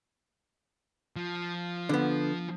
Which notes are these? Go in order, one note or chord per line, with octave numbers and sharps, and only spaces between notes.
F3
D3 B3